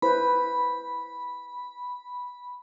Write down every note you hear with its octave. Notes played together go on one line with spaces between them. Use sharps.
E4 B4 C5 B5